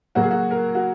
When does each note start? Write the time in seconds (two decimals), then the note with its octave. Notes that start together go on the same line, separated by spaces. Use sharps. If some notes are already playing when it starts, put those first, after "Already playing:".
0.15 C#3 F#3 A#3 C#4 F#4
0.23 G#4
0.31 F#4
0.51 A#4
0.75 F#4